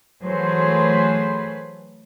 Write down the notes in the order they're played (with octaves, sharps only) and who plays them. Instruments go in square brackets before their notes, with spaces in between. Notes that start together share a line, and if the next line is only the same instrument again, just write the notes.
[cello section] E3 F#3 A3 G#4 B4 C5